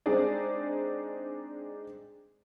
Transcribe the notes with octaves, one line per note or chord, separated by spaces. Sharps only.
G#3 C4 D4 D#4 G#4 D5